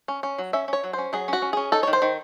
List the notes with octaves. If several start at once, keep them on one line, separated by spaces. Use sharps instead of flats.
C#4
C#4
F#3
C#4 E5
C#4 C#5
F#3
C#4 C5
F#3 G#4
C#4 F#4
C#4
C#4 G#4
D#4 A4
D#3 C#5
C5
D#3